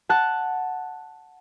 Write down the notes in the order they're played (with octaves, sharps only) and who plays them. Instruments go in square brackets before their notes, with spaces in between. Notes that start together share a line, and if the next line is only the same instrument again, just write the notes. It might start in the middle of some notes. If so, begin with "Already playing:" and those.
[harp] F#5 A5 F#6